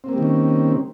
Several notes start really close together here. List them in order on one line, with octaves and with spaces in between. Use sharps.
C4 A#3 G3 D#3 C#4